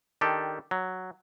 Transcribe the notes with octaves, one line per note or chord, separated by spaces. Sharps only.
D#3 D4 G4 A4
F#3